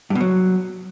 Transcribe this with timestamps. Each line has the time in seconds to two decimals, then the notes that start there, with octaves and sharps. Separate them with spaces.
0.10 G2
0.15 B2
0.21 F#3